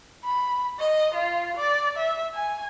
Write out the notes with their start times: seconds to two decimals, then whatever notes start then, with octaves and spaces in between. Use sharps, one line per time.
0.24 B5
0.79 D#5
1.15 F4
1.57 D5
1.97 E5
2.35 G#5